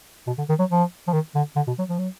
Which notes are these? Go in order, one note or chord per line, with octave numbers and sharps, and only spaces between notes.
B2
D3
D#3
F#3
F3
F3
D#3
D3
D3
B2
F#3
F3
F#3